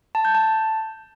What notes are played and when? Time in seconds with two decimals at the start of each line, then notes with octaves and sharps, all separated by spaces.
0.15 A5
0.25 G6
0.35 A5